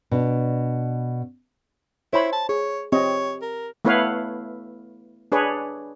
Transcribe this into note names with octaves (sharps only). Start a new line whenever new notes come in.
B2 D4
E4 C5 C#5 B5
A5
G#4 C#5
C4 G4 C#5 D#5
A#4
A3 B3 E4 B4 C#5 F5
D4 G#4 B4 C#5